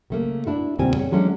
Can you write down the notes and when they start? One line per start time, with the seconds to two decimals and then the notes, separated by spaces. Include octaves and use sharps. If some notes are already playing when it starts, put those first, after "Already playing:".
0.10 C#3 A3 A#3
0.46 D4 E4 F#4
0.79 E2 A#2 C#3 G3 C4 G#5
0.96 G#4 C#5
1.11 E3 F#3 G#3 A3 C#4 D4